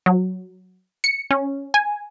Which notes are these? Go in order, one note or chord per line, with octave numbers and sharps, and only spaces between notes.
F#3
C#7
C#4
G#5